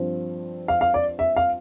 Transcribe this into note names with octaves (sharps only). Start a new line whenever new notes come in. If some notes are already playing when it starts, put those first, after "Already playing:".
Already playing: G2 F3 C4
F5
F5
D5
E5
F5